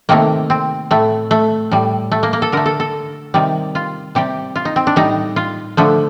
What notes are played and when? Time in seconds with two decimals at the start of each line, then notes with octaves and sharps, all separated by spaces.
0.09 C3 D#3 A3 A#3
0.50 C4
0.91 A2 A3
1.31 A3
1.71 A2 G3
2.12 A3
2.23 A#3
2.33 A#3
2.42 A4
2.52 D3 A3 A#4
2.66 A4
2.80 A4
3.34 C3 D#3 G3
3.75 F4
4.15 C3 G3 G4
4.56 F4
4.65 D#4
4.76 C4
4.87 D4
4.96 A2 G3 D#4
5.36 F4
5.77 D3 F3 A3